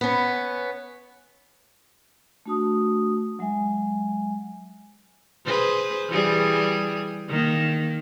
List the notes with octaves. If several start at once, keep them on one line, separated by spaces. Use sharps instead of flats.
B3 C#4
A3 D4 F#4 A5 D#6
F#3 G#3 E5 G#5
G#4 B4 C5
E3 G3 G#4
D#3 A#3